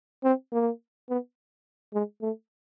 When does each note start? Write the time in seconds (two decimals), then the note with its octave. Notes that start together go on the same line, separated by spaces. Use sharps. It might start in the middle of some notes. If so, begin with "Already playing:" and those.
0.24 C4
0.52 A#3
1.10 B3
1.94 G#3
2.22 A3